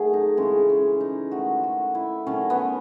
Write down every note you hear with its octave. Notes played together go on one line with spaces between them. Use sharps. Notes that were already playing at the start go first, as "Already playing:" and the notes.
Already playing: D#3 F#3 A3 G#4
D#4
C#3 E3 G#3 C#4
C#4
D#4
D#3 A3 F#4
F#4
E4
D#3 F#3 A3 C#4
B3